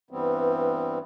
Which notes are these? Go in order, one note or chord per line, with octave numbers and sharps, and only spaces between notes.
G2 E3 G3 B3 C4